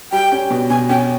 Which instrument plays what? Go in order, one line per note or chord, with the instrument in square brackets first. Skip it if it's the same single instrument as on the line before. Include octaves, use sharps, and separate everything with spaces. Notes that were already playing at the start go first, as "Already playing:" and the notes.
[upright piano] G3 [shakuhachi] G5
[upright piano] C#4
B2
[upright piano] B2 [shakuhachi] G#5
[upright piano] C#4 [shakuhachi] G5